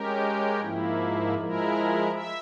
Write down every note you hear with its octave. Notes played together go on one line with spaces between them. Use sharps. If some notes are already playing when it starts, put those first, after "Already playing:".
Already playing: G#3 C#4 G4 A#4
G#2 F3 A#3 E4
F3 G#3 E4 A#4
E5